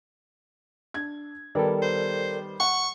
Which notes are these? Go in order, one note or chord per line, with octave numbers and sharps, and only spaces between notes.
D4 G#6
D#3 G3 B3 A4 A#4 D5
C5
F#5 C#6